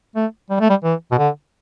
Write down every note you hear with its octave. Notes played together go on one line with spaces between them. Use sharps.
A3
G3
A3
G3
E3
B2
D3